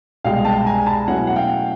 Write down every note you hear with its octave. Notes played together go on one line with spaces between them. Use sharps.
C2 B2 G#3 F5 G5
G5 A5
G#5 A#5
A5 B5
B2 F#3 A3 C#4 E4 F#5 G#5
F#5
F5 G5